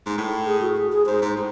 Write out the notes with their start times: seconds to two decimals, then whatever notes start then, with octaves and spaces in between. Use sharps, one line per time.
0.06 G#2
0.18 A2
0.47 G#4
0.61 F#4
0.77 G#4
0.92 G#4
1.07 G#2 C5
1.21 G#2
1.36 A2